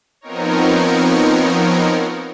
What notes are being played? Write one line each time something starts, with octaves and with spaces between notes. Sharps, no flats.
F3 B3 C4 D#4 A#4 C#5